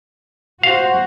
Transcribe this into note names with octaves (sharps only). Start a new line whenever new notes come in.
F#4 C5 F5